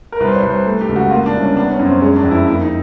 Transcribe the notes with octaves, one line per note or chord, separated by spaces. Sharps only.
A#4
C2 B4
C5
C#5
C2
C5
A3
G4
C#2
F#4
A#3 F4
D4
C2
C#4
B3 D4
C#4
F#2
C4
G#3 C#4
D4
F2
E4
A#3 E4
D#4